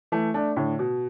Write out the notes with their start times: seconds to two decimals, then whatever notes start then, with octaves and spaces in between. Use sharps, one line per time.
0.12 E3 A3
0.34 A3 D4
0.56 A2 D3
0.79 B2